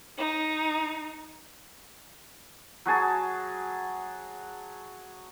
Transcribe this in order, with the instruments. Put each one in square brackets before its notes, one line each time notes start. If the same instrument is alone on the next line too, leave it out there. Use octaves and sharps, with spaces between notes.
[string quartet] D#4
[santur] F#3 F#4 G#4 A5